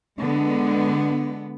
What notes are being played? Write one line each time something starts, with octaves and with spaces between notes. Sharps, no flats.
D3 G#3 B3